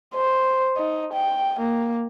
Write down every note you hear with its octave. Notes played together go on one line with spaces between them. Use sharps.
C5
D#4
G5
A#3